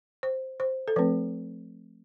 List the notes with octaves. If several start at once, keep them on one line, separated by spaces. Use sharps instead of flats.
C5
C5
A4
F3 A3 C4 B4